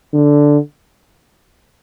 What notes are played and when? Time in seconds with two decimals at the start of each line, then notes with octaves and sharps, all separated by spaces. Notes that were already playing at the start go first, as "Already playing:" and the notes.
0.14 D3